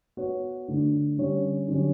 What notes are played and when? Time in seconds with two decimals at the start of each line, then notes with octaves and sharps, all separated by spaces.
0.17 B3 F#4 C#5
0.68 D3 A3 D4
1.18 D3 G3 C#4 G4 C#5
1.68 D3 F#3 C#4 G4 C#5